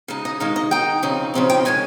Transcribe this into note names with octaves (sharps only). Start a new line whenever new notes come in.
C#3 G#3 D#4
D#5
D#3 G#3 D#4 F5
D#5
D#3 G#3 D#4 G5
C#3 F3 C4 D#4
C#3 F3 C4 D#4
G5
D#3 G#3 C#4 G#5